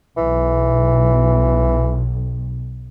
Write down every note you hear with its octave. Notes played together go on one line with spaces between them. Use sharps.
B1 E3